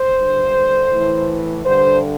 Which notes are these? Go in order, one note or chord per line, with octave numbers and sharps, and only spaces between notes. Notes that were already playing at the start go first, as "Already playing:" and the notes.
Already playing: C5
G2 D3
A2 E3
G2 D3 C5